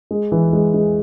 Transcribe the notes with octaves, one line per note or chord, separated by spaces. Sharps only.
G#3
E3
G#3
G#3